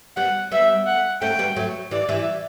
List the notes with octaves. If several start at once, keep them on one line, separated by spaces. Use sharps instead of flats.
G3 B3 F#5
G3 B3 E5
F#5
A3 C#4 G5
G3 B3
F#3 A3
E3 G3 D5
E3 G3